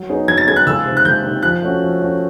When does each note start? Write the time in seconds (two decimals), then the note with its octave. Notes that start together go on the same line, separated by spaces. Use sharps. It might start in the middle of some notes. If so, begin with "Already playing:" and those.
Already playing: F#3
0.09 B3 D#4 G#4 C#5
0.28 F#3 G#6
0.38 A6
0.47 B3 D#4 G#4 C#5 G#6
0.56 F#6
0.67 C#2 E6
0.86 C3 D#3
0.97 F#6
1.05 C#2 G6
1.24 C3 D#3
1.43 F3 F#6
1.62 A3 C#4 F#4
1.82 F3
2.00 A3 C#4 F#4